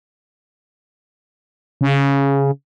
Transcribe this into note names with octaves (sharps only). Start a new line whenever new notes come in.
C#3